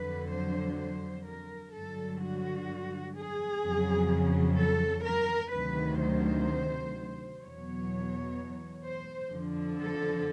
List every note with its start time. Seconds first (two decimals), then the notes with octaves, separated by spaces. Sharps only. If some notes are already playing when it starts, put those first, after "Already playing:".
Already playing: F2 D3 F#3 B4
0.32 C5
0.79 C5
1.27 A#4
1.75 G2 D3 F#3 A4
2.21 F#4
3.16 G#4
3.64 F2 C#3 F#3
4.58 A4
5.05 A#4
5.52 D2 C3 D#3 F#3 B4
6.00 C5
7.42 E2 B2 F#3 C#5
8.84 C5
9.31 F2 D3 F3
9.79 A4